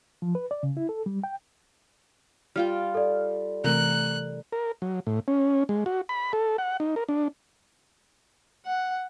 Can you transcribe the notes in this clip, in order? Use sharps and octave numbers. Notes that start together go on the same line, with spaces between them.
F3
B4
D5
C#3
E4
A4
G3
G5
G3 F4 G5 F6
A4 D5
C3 E3 A3 A#4 F#6
A#4
F#3
A2
C#4
G#3
F#4
B5
A4
F#5
D#4
A#4
D4
F#5